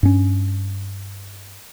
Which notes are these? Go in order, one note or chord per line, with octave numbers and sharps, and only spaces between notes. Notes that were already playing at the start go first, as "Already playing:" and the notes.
G2 C#4